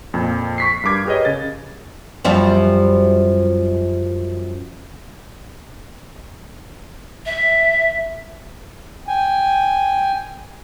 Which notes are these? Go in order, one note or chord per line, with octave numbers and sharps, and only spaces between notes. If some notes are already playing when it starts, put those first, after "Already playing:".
F2 A#2
C#6 B6 C7
G2 A#4 D6 G#6
G4 G#4 A#4 B4 C#5 D#5
C#3 A6
F#2 F3 G3
E5
G5 G#5